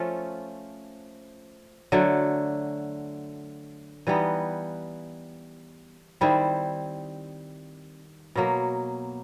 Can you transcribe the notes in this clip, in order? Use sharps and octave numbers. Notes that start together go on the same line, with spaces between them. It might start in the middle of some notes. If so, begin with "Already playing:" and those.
Already playing: F3 A3 C#4 F4
D3 F#3 A3
E3 G3 B3 D#4
D#3 G3 C4 E4
B2 F#3 A#3